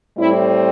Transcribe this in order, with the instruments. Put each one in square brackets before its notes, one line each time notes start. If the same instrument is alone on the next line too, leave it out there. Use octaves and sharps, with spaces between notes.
[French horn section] A2 G3 C4 E4